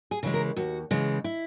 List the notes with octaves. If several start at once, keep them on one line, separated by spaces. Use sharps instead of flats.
G#4
C#3 E3 G#3
A#4
D#2 F#4
C#3 E3 G#3
E4